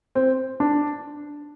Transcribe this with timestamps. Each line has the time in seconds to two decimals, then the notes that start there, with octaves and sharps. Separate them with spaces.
0.15 C4
0.60 D4